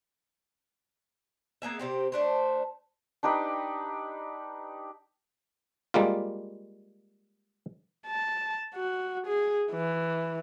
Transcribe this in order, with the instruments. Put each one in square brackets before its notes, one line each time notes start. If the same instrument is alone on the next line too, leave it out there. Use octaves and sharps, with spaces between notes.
[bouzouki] A#3 B3 G#4 E5
C3 C4 G4
A3 D4 C5
[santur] D4 D#4 G4 B4
[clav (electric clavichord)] G3 G#3 A#3 F4
[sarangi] A5
F#4
G#4
E3